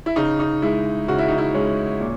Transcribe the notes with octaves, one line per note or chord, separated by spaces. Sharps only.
E4
C#3 D#4
D#4
G#3 E4
C#3 F#4
E4
D#4
E4
G#3 C#4
A#2